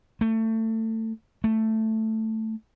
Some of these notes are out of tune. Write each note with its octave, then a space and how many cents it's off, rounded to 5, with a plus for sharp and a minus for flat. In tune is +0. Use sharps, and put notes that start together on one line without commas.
A3 +25
A3 +5